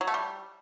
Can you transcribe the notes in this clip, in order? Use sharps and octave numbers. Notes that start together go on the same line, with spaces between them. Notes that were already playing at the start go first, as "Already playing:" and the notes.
F#3
A3
G3